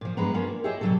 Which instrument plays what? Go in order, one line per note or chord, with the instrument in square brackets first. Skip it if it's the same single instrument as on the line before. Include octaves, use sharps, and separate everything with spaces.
[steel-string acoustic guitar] A#2 F3
G2 F3 G#3 B3 B4 A#5
B3 C#4 D4 F4 A#4
A#3
E4 G4 G#4 C#5 D#5 E5
B2 D3 E3 F#3 G3 A4